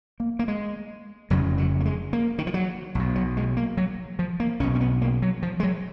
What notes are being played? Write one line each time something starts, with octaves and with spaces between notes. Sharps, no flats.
A#3
A#3
G#3
F1 F2 C#3 F#3
F#3
A#3
G#3
A#3
D#3
F3
F#3
B1 B2
F#3
G#3
A#3
F#3
F3
A#3
B1 B2 C#4
C#4
B3
A#3
F#3
F3
G#3
F#3